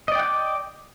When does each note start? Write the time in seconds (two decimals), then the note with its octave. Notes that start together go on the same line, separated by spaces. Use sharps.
0.08 D#5
0.12 D5
0.15 G5
0.19 F#5
0.23 D6